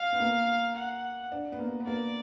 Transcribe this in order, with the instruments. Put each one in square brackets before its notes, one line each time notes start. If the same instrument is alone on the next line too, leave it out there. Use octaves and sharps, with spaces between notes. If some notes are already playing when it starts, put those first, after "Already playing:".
Already playing: [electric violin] F5
[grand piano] B3
A#3
[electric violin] F#5
[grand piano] D4
B3
A#3
B3
[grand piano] A#3 [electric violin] D5